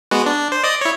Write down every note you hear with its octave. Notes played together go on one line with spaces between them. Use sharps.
G#3 B3 F#4
D4
C5
D5 D#5 D#6
E4 C#5